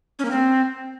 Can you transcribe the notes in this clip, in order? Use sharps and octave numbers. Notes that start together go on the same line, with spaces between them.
C#4
A#3
C4